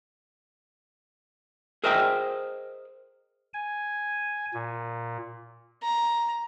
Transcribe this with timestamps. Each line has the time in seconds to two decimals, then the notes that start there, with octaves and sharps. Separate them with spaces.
1.84 G#4 A#4 C5 D#5 E5 G5
3.54 G#5
4.54 A#2
5.83 A#5